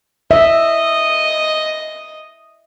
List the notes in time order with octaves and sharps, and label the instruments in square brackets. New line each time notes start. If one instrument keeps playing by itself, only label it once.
[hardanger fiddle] D#5 [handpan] E5